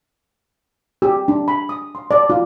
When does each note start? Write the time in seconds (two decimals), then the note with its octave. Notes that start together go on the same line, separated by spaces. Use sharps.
1.02 G4
1.28 D4
1.48 B5
1.69 D#6
1.95 C6
2.11 D5
2.30 F4